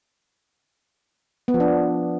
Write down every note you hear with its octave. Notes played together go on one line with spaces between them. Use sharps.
B3
F3
D4